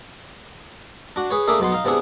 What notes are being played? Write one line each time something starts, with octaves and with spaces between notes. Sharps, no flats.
D4 F#4
G#4 B4 C#5
A3 A#3 D4 G#4 E5
B1 B2 B3 C6
D#4 F5
C3 B3 D4 E4 G#4